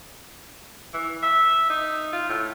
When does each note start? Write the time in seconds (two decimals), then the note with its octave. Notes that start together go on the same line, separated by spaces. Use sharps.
0.93 E3
1.22 E5
1.69 D#4
2.13 F4
2.30 A2